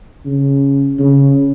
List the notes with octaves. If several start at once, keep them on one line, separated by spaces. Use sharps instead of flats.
C#3
C#3